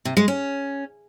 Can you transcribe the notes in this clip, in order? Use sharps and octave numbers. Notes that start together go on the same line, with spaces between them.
C3
G#3
C#4